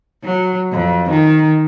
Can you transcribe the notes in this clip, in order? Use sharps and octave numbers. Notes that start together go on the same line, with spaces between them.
F#3
F2
D#3